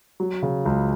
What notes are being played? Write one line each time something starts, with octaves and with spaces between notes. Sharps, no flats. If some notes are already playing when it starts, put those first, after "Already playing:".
F#3
C#3
C#2